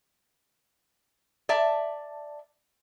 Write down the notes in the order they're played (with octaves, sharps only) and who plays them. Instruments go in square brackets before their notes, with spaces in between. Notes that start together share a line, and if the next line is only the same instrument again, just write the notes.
[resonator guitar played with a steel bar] D5 E5 A5